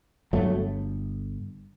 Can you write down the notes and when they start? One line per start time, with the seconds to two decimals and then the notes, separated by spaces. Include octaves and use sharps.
0.33 G1 G2 F#3 A3